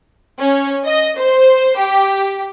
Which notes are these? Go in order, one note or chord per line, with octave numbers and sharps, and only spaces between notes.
C#4
D#5
C5
G4